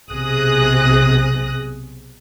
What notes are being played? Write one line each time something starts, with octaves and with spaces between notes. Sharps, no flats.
B1 C3 G#4 D#6 F#6 A#6